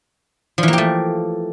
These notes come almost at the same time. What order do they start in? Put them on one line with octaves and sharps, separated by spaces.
F3 E3 A#3 G4 A3